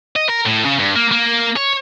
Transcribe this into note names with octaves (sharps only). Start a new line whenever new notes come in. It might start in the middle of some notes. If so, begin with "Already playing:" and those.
D#5
A#4
A2
C#3
G2
A#3
A#3
C#5